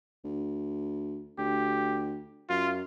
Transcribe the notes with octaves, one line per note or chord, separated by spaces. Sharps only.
D2
D2 G4
F#2 F4